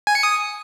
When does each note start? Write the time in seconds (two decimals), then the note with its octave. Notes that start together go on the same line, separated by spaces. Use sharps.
0.07 G#5
0.15 C#7
0.23 D#6